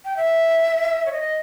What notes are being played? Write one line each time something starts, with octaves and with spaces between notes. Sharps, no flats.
G5
E5
C#5
D#5